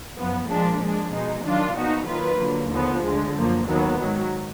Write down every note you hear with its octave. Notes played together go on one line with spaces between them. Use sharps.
F#2 F3 B3
A#2 F3 G#3 D4
F3 G#3 D4
B2 G#3 D#4
D#3 F#3 D4 F4
A#2 F3 B3 D#4 F#4
D#3 F#3 A#3 F4 B4
D3 F#3 A#3
D#2 D3 F3 B3
D2 D3 G#3
F#2 F3 A#3
D#2 D#3 F#3 B3
G#2 D#3 F#3